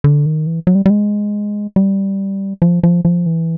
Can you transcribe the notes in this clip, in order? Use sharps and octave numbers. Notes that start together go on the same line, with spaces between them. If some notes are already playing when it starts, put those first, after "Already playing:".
D3
D#3
E3
F#3
G3
G3
G#3
G3
F3
F3
F3
E3